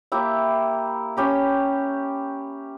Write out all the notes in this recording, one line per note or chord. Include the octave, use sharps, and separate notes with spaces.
A#3 E4 G4 E5
C#4 G4 B5